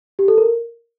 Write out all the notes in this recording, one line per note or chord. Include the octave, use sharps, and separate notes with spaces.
G4
A4
A#4